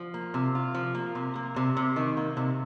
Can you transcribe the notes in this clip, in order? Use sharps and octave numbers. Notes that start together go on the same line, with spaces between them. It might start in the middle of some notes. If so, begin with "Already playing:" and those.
Already playing: F3
A#3
C3
F4
F3
A#3
C3
A#3
C3
C3
D#3
A#3
C3